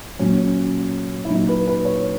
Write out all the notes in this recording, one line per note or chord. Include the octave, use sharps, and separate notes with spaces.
A#2 F#3 C#4
E4
A#2 F#3 D#4
B4
B4
C#5